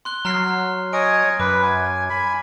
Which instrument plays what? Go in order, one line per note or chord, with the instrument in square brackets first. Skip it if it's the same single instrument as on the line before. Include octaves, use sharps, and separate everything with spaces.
[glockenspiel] C6 F#6 G7
[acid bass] F#3 [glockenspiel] A#5 F6 C7
[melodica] C#5 D#5 G#5 [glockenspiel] D7
[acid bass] F#2 [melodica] B4 [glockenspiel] D6
[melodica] G#5
G#5 B5